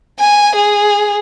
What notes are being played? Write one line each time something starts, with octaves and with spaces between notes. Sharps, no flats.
G#5
G#4